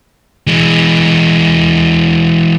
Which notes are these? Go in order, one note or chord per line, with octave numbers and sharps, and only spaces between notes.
E3 G#3